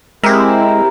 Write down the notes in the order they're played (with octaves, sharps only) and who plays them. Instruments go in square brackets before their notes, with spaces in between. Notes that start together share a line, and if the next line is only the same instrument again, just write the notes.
[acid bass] G#3 [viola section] C4 E4 [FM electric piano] G4 E5 [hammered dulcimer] A#4